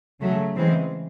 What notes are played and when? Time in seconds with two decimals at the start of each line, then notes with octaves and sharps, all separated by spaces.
0.21 C#3 F#3 A3
0.55 C#3 E3 G#3 C4